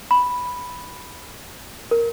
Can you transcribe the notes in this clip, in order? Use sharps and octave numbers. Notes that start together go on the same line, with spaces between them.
B5
A#4